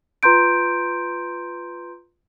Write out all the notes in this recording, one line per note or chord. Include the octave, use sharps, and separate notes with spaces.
F4 B4 A#5 C6 G6 D7